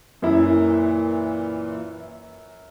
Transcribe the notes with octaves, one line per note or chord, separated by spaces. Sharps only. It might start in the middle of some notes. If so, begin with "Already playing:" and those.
F#2 A#2 E3 E4